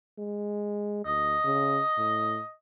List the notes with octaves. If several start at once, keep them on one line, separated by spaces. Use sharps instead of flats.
G#3
D2 D#5
C#3
A2